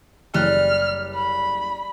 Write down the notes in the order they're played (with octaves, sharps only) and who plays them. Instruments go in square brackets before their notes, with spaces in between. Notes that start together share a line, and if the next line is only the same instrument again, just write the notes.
[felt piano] F#1 F#6 [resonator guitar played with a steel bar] G3 [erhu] F6
[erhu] B5